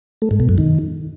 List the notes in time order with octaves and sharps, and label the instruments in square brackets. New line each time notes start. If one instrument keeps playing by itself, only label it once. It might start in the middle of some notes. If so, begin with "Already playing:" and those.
[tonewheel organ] A3
G#2
B2
F#2
D#3